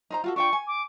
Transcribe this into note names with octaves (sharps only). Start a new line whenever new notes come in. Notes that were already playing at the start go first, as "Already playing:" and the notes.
D#4 C5 A#5
F4 F#4 A4
D4 F4 G5 C#6
G#5
D6